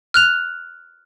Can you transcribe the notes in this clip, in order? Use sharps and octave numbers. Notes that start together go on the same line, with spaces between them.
F6 F#6 F7